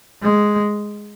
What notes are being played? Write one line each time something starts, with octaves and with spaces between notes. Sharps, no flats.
G#3